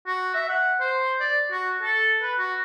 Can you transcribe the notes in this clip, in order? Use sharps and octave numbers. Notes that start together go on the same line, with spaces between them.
F#4
E5
F#5
C5
D5
F#4
A4
B4
F#4